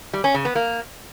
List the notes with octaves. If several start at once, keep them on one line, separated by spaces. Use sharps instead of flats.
G3
C#4
C#3
B3
A#3